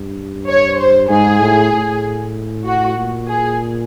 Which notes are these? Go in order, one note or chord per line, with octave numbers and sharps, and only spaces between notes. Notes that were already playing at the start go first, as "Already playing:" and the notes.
Already playing: G2
C#5
C5
G#2 G#4
A2
A2
F#4
A#2
G#4